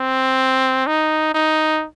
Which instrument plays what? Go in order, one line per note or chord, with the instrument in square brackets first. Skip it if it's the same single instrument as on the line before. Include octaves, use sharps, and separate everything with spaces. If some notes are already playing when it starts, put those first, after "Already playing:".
Already playing: [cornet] C4
D#4
D#4